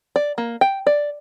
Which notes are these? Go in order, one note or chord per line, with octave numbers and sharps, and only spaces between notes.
D5
A#3
G5
D5